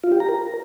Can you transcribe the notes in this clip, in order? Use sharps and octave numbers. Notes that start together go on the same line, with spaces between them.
F4
G4
A#5
A#4